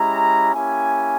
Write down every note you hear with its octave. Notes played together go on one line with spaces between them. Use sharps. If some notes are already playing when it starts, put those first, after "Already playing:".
Already playing: G#3 C#4 E4 G4 A#5
A#3 C#4 E4 G4 G#5